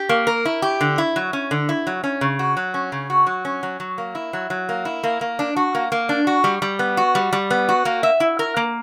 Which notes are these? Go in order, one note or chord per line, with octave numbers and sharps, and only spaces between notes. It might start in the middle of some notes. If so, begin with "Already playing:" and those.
Already playing: G4
A#3
A#4
E4
G4
D3
E4
F#3
C#4
D3
E4
F#3
C#4
C#3
F#4
F#3
C#4
C#3
F#4
F#3
C#4
F#3
F#3
A#3
E4
F#3
F#3
A#3
E4
A#3
A#3
D4
F#4
A#3
A#3
D4
F#4
G3
G3
B3
F#4
G3
G3
B3
F#4
A#3
E5
E4
A#4
A#3